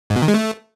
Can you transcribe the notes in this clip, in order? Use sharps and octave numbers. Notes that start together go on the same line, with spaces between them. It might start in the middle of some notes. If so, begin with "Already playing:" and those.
G#2
B2
D#3
G#3
A3